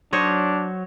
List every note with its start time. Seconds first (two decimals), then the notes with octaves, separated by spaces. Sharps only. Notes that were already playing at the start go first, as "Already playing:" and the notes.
0.13 F#3 D4 C5 C#5 D#5